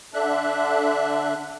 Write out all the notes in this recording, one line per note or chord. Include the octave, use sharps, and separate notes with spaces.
D3 D4 E5 F#6